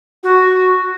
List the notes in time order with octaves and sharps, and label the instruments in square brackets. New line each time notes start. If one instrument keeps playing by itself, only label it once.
[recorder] F#4